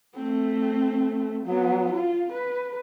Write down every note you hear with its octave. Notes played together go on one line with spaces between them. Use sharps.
A3 C4
F#3 B3
F4
B4